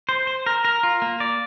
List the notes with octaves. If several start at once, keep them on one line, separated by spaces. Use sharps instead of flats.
C5
C5
A#4
A#4
F4
A#3
D5